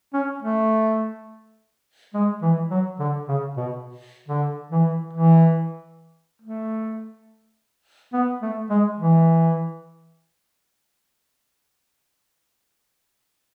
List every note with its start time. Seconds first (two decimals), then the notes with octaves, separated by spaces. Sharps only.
0.13 C#4
0.42 A3
2.14 G#3
2.42 E3
2.70 F#3
2.99 D3
3.28 C#3
3.57 B2
4.28 D3
4.71 E3
5.13 E3
6.42 A3
8.13 B3
8.42 A3
8.70 G#3
8.99 E3